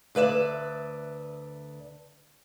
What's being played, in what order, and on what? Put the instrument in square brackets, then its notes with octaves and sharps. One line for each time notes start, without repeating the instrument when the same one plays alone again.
[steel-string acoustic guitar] D2 B4 D5 E5